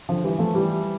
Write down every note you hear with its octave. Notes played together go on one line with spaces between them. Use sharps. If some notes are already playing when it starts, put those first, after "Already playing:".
D3 F3
E3 G3
F3 A3
E3 G3